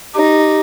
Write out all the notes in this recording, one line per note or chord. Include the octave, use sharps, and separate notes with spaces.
D#4 G4